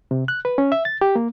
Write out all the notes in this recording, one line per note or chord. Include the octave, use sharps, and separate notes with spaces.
C3
F#6
B4
C#4
E5
A6
G4
A#3